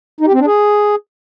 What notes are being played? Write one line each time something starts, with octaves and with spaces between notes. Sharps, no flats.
D#4
G4
C4
D4
G#4